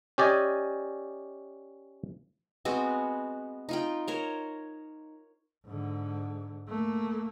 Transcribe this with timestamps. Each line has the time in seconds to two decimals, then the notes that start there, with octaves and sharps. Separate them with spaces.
0.18 C#4 G4 D5 D#5 G#5
2.65 G#3 B3 C4 F#4
3.69 D#4 F4 G5
4.08 A#4 C5 C#5
5.66 G#2 D3
6.68 A3 A#3